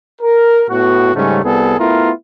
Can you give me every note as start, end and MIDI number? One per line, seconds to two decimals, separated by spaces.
0.21 0.64 70
0.69 1.11 45
0.69 1.11 59
0.69 1.11 66
1.14 1.39 44
1.14 1.39 49
1.14 1.39 55
1.14 1.39 57
1.14 1.39 61
1.43 1.75 36
1.43 1.75 55
1.43 1.75 59
1.43 1.75 68
1.43 1.75 69
1.79 2.10 57
1.79 2.10 59
1.79 2.10 64
1.79 2.10 65
1.79 2.10 70